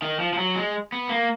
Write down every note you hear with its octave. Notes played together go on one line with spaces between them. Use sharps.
D#3
F3
F3
F#3
G#3
B3
A#3